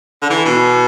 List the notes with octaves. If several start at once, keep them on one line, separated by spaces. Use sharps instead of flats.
D3
E3
B2